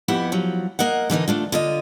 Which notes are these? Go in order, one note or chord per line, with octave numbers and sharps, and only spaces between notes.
F2 B3 E4 G4 F#5
F3 F#3
A#3 A#4 D#5 F#5
D3 E3 D#4 A#4
A3 D4 F4
D3 F4 D#5